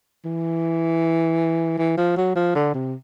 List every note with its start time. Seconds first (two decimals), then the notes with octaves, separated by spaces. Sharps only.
0.25 E3
1.78 E3
1.97 F3
2.17 F#3
2.36 F3
2.55 D3
2.74 C3